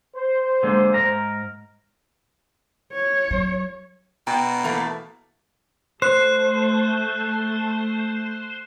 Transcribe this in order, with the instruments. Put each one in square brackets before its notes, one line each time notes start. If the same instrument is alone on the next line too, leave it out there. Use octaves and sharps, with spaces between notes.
[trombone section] C5
[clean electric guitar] D3 G#3 A#3
G#2 A#4 A#5
[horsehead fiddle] C#5
[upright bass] F#3
[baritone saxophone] B2 [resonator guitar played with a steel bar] G5 [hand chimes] A#5
[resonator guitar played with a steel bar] E3 A3 A#3
[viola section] A3 [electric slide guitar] C5 [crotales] F#6